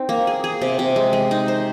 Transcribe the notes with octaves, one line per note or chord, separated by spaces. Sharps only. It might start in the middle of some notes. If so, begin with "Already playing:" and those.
Already playing: C4 D#4
A#3
G#4
G#4
C3
C3
G#3
G#3
D#4
C5